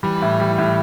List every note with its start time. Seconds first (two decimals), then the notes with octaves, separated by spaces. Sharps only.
0.03 E3 G3
0.22 A2
0.40 G3
0.58 A2